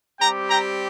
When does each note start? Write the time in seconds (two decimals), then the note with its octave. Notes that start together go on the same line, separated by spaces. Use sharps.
0.20 G3 C4 G4 G5 A#5
0.49 G5 A#5